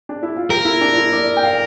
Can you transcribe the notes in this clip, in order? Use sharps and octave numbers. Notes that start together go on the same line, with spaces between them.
D4
E4
F4
G4 A#4
E4
D4
E4
D5
G5
F5